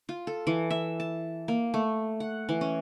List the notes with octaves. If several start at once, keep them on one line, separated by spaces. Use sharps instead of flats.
F4
A4
E3
E5
A5
A#3
A3
F#5
E3
C#4